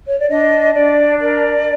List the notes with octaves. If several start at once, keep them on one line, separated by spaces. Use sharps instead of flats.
C#5
D5
D4 D#5
D4 D5
A#4 D5